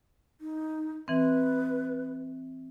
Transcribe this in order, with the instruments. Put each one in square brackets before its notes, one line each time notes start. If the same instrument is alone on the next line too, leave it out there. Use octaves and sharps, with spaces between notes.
[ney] D#4
[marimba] E3 C4 [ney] B4